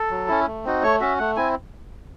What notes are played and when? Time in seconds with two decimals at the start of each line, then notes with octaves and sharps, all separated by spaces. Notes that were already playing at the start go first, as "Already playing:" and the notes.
Already playing: A4
0.11 F#3
0.28 C#4 E4
0.47 A3
0.65 C4 D#4 F#4
0.83 A3 C#5
1.00 C#4 F#4 E5
1.19 A3 F#5
1.36 C4 E4 G#5